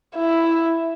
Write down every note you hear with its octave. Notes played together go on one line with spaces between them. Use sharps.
E4